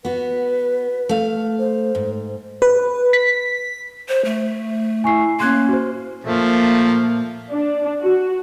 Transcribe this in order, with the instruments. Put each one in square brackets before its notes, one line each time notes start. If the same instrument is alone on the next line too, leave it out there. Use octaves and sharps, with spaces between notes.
[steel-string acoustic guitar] B3 F#4 [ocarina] B4
[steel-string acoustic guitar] A3 F5
[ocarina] C5
[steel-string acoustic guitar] G#2
[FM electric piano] B4
B6
[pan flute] C5
A3
[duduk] E4 [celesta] G#5 C#6 C7
[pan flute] A#3 [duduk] C#4 [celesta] C6 F#6 G#6
[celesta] F#4 C5
[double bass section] A#2 A#3 [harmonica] F3 A3
[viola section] D4
F#4